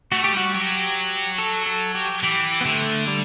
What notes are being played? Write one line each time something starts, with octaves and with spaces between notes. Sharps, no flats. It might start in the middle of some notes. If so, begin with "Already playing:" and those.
A3 F#4
G4
G3 F#4
F#3 G4
A4
A4
G4
E3 G4
B3
D3 A3
G3